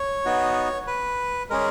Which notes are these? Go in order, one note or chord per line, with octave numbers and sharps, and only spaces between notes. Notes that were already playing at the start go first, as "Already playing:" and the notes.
Already playing: C#5
B3 D#4 F#4
B4
G#3 C#4 G#4 A#4